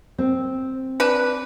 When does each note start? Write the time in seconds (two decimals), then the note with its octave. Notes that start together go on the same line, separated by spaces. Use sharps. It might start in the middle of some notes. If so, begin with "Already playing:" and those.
0.18 C4
1.00 D4 B4